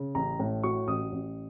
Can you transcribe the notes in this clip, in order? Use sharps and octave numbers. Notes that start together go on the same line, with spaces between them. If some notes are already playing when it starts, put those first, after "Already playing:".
Already playing: C#3
A1 A#5
A2
F#3 C#6
A1 D#6
A1